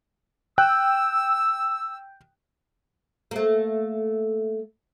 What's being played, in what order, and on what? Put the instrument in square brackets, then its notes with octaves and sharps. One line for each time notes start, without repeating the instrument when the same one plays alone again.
[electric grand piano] G5 F#6 [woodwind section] E6
[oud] A3 A#3